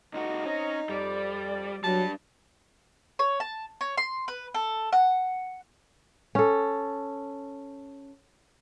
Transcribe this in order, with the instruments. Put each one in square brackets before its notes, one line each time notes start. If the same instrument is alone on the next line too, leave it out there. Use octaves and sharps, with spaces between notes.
[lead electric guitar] C#2 F#4 [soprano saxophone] D#4
[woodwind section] C4 D#5 A#5 [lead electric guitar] C#4
[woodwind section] F2 D5 [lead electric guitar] G3
[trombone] F#3 [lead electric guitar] G3 D4 [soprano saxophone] A5
[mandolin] C#5
A5
C#5
C6
B4
A4
F#5
[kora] C#4 A4